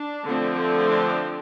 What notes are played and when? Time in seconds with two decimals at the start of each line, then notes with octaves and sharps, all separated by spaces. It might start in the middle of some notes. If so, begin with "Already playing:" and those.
Already playing: D4
0.24 D3 F3 A3 C4
0.89 D4